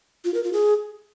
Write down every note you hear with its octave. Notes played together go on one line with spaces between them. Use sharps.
F4
A#4
F4
G#4